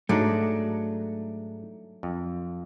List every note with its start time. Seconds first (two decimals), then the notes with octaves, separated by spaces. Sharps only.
0.09 G#2 F#3 A3 D4 D#4 D5
2.03 F2